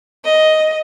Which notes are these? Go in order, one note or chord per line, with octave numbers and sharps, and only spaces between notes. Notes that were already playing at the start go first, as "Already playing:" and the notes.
D#5